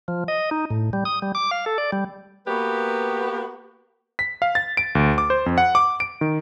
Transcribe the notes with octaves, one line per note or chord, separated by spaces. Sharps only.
F3
D#5
D#4
A2
G3
D#6
G3
D6
F5
A4
D5
G3
A#3 B3 F#4 G4 B4
B6
F5
A6
D7
D2
D6
C5
F2
F#5
D6
D7
D#3